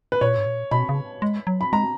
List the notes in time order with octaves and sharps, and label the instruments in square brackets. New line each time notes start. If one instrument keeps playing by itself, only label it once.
[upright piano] B4
[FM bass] A#2 [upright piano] C#5
[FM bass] G#2
A#2
[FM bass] B2 [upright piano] B5
[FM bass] C#3
G#3
F#3
[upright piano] B5
[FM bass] G#3 [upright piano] A#5